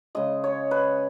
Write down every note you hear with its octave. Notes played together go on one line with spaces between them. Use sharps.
C#3 G#3 D#5
C#5
B4